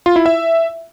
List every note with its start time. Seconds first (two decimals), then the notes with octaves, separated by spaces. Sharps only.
0.06 F4
0.16 E4
0.26 E5